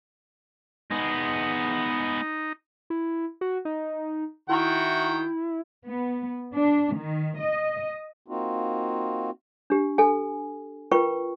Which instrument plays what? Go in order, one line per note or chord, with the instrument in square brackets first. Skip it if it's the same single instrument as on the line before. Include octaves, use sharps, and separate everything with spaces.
[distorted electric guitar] G#3 B3 [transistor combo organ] D#4
[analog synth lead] E4
F#4
D#4
[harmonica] D#3 F#4 G5 [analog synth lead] E4
[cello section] B3
D4
D#3
D#5
[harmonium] A#3 C4 D#4 F4 F#4
[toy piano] D4 G4
A4 G#5
F4 A#4 B4 G5 C#6